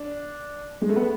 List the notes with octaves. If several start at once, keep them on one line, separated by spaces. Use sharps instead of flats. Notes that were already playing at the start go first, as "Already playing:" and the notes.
Already playing: D4
G#3
A3
B3